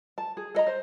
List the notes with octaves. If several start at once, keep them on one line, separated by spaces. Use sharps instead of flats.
A5
G#4
A4 D#5 A#5
C5